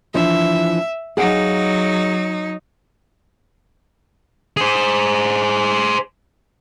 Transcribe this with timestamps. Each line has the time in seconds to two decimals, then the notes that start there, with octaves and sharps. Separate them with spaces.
0.14 E3 F3 D4 E5
1.17 F#3 D#4 G#4 F5 F#5
4.57 G#4 C5